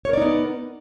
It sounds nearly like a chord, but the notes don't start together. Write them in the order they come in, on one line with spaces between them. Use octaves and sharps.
C#5 A#4 D5 D#4 B3